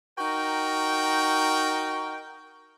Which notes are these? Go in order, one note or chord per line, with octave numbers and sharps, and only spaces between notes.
D#4 F#4 A#4 G5